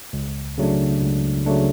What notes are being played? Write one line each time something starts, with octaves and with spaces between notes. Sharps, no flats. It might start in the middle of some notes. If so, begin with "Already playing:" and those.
C#2
C#3 F#3 A3 D4
C#2
C#3 F#3 A3 D4